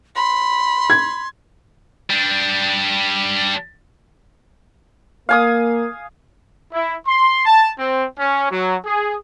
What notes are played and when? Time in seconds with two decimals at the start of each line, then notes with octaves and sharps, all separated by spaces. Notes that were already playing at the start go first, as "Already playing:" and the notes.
0.16 B5 C6
0.90 G#6
2.10 G3 D4
5.29 A#3 F5 G#5 D#6
6.73 E4
7.08 C6
7.45 A5
7.79 C4
8.19 C#4
8.51 F#3
8.86 G#4